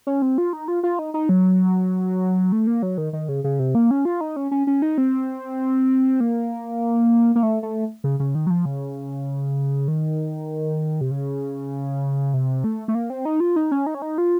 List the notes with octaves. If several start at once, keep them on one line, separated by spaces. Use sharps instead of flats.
C#4
C4
F4
D#4
F4
F4
D#4
D#4
F#3
A3
A#3
F#3
D#3
D#3
C#3
C#3
C3
A#3
C#4
F4
D#4
C#4
C#4
C#4
D#4
C4
A#3
A#3
A3
A3
C#3
C#3
D#3
F#3
F3
C#3
D#3
C3
C#3
C3
A3
A3
A#3
C4
D#4
F4
D#4
C#4
D#4
C#4
D#4
F4